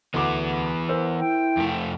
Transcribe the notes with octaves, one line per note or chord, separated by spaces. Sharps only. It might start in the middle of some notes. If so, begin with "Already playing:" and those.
D2 E3 B3 D6
A#4 C5 E6
E4 G5
F2 A3